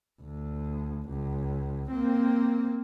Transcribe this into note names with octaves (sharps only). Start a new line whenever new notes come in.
D2
C#2
A#3 C4